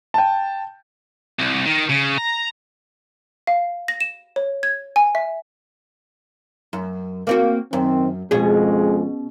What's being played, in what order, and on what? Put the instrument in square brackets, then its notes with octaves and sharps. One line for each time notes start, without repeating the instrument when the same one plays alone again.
[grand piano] G5 A5
[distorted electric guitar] C2
D#3
C#3
A#5
[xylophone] F5
A#6
E7
C#5
G#6
G#5
E5
[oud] F#2
A#3 C4 F#4
[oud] F#2 [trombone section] D#3 C4
[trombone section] F2 G#3 [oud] B2 C#4 G#4